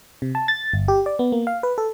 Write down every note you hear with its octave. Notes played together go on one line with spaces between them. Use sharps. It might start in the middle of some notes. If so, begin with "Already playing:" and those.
C3
A5
A6
G1
G4
D5
B3
A#3
F5
B4
A4